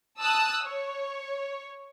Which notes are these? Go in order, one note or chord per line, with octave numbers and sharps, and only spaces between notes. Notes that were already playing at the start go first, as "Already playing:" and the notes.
A5 D#6 E6 F#6
C#5